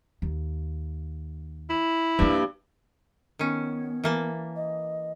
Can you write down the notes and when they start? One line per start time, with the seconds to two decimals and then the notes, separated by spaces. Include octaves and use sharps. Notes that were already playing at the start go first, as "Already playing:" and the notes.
0.22 D#2
1.70 E4
2.19 G2 F3 A#3
3.39 D#3 B3 C#4
4.04 E3 A#3 A5
4.56 D#5